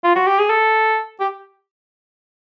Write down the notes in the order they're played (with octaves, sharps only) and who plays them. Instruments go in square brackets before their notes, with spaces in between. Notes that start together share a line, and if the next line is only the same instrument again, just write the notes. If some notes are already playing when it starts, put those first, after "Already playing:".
[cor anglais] F4
F#4
G4
G#4
A4
G4